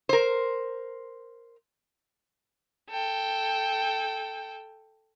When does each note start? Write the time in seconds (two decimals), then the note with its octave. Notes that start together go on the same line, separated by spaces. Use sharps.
0.09 A#4 C5
2.90 A4 G5